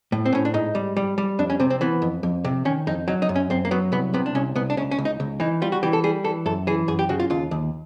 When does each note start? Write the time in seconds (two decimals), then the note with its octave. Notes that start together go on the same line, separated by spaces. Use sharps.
0.12 A2
0.25 C4
0.33 A2 C#4
0.45 D4
0.54 G#2 D#4
0.75 G3
0.97 G3
1.18 G3
1.39 F2 D4
1.50 C#4
1.60 C3 C4
1.70 C4
1.81 E3 B3
2.02 F2
2.23 F2
2.45 C3
2.65 D#3 C#4
2.87 F2 D#4
3.08 F#3 D#4
3.22 D#4
3.29 F#2
3.36 C#4
3.50 F#2 C4
3.65 A#3
3.71 F#3 B3
3.92 C2 B3
4.14 C3 B3
4.26 D4
4.35 C2 C#4
4.55 C2 B3
4.70 D4
4.77 C#2 C#4
4.91 C#4
4.98 C#2
5.05 D#4
5.20 C#2
5.40 E3 D#4
5.62 G3 F4
5.72 F#4
5.83 E3 G4
5.93 A4
6.04 G3 G#4
6.24 E3 A4
6.46 F#2 A4
6.67 E3 G#4
6.88 F#2 G#4
6.99 G4
7.09 C#3 F#4
7.20 F4
7.30 D#2 F4
7.51 D#2